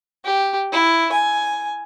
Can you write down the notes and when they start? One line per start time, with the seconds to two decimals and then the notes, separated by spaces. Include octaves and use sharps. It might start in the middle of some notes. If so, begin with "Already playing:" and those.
0.25 G4
0.73 E4
1.12 G#5